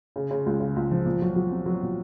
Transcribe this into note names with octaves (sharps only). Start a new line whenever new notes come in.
C#3
C#3
C#2
C#3
C#2
F3
A#2
F#3
F#3
C4
F#3
A#2